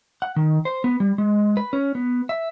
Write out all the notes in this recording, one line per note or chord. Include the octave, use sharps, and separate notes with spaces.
F#5
D#3
C5
B3
G3
G#3
B4
C#4
B3
E5